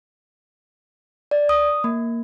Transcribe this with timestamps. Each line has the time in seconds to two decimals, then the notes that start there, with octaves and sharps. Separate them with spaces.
1.31 D5
1.49 D#6
1.84 A#3